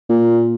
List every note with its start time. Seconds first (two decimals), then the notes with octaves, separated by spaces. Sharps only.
0.09 A#2